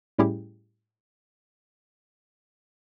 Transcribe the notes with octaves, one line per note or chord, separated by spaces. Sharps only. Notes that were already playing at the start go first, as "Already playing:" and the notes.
A2 G3 C#4 E4 G4 G#4